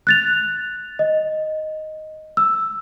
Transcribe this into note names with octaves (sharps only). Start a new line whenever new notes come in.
F#6 A6 F7
D#5
E6